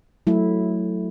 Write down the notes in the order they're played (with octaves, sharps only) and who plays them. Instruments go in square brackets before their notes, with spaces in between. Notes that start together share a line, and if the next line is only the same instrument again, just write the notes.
[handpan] F#3 A3 E4